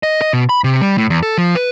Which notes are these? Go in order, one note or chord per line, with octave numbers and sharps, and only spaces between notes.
D#5
D#5
B2
B5
C3
G3
A2
E2
A4
F3
B4